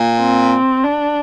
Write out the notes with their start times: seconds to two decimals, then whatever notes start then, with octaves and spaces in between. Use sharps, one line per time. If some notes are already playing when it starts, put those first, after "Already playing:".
Already playing: A#2
0.21 C4
0.84 D4